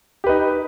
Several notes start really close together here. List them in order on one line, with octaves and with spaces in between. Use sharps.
G4 B4 D#4